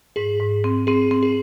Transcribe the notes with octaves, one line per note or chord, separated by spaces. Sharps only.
G#2 G#4
G#2
C4
C4 G#4
C4
G#4